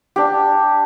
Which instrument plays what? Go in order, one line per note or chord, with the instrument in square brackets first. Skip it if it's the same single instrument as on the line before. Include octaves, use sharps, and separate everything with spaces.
[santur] D4 G4